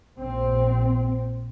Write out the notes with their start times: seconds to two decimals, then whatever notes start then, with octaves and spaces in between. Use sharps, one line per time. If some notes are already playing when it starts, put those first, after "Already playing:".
0.18 A#1 C4